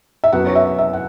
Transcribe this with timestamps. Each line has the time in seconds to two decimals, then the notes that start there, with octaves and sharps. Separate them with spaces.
0.24 E5
0.33 F#2 F#3 B3 F#5
0.47 C#5
0.55 E5
0.78 E5
0.93 F#5